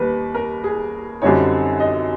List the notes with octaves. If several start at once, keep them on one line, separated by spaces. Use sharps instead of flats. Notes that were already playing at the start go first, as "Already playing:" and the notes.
Already playing: D#2 D#3 G3 B4
A#4
G#4
F#2 D3 G3 C4 D#4 C#5
D#5